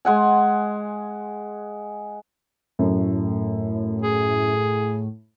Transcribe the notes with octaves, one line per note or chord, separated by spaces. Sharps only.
G#3 F#5 G#5
F#2 A2
G#4